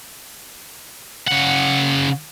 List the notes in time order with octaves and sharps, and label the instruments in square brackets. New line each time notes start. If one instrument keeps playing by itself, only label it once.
[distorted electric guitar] C#3 F#5